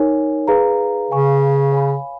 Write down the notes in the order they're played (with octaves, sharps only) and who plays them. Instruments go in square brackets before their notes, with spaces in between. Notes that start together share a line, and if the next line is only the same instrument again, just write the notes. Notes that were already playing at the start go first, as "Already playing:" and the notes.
Already playing: [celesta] D#4 A#4 C#5 G#5
G#4 B4 F5 A#5
[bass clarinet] C#3 [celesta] B4 F5 G#5 C#6
[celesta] C#5 F5 G#5 B5